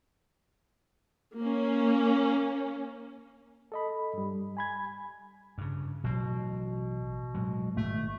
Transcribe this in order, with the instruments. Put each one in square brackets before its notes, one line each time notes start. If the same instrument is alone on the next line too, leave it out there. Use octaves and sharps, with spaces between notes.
[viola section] A#3 C#4
[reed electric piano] A4 D#5 B5
G2 G3
G#5 B5 G#6
[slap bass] G2 C#3
[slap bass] A1 F#3 [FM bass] B2
[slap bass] A2 F#3 G#3
[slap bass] G#1 A2 [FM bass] A3